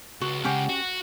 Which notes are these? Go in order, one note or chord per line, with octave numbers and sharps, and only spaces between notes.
C#2 F#4
C#3 G#3 C#4 G4 F#5
F#4